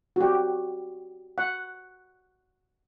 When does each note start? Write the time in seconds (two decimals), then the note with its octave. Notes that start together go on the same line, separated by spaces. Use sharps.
0.16 F#4 G4
1.38 F#5